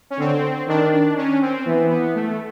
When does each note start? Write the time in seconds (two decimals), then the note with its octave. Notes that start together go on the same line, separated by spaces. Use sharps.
0.10 C#4
0.19 D3 C4
0.68 D#3 D4
0.92 D4
1.17 C#4
1.41 C4
1.66 E3 B3
1.89 B3
2.15 A3